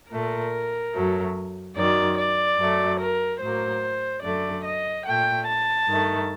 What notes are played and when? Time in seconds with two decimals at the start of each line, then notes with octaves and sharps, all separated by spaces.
0.11 A#2 A3 A#4
0.94 F#2 F#3 A3
1.76 F#2 D#3 F#3 D5
2.17 D5
2.58 F#2 F#3 A3
2.99 A#4
3.40 A2 F#3 A#3 C5
4.22 F#2 D3 A3 D5
4.64 D#5
5.05 A#2 A3 G5
5.47 A5
5.87 G2 D#3 A3